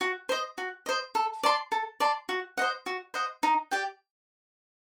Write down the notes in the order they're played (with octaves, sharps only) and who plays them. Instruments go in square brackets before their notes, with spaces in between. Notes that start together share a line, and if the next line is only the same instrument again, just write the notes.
[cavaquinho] F#4
C5 D#5
F#4
C5 D#5
A4
D5 A5 C6
A4
D5 A5 C6
F#4
C5 D#5 F#5
F#4
C5 D#5 F#5
D#4
G4 D5 G5